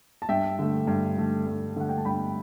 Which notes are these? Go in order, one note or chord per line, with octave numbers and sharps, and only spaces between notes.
A5
G2 E5 G5
D3 A3
G2
D3 A3
G2
D3 A3 F#5
G5
A5
G2 G5 B5